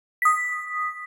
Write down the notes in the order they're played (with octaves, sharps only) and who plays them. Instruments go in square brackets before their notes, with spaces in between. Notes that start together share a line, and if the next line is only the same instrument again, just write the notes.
[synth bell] D#6 B6